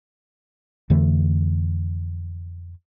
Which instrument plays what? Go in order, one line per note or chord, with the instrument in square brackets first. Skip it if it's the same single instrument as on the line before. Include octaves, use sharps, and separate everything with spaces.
[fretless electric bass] F2 D3 E3 A3